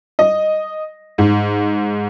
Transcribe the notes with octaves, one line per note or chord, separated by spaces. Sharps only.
D#5
G#2